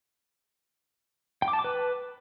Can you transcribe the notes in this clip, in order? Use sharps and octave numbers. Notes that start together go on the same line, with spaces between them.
G5
D6
A5
D6
B4